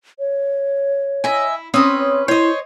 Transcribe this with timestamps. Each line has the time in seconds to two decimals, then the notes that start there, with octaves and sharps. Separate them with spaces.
0.19 C#5
1.24 E4 D#5 E5 G#5
1.74 C4 C#4 B4 D#6
1.98 C#5
2.28 E4 C5 C#5 D#5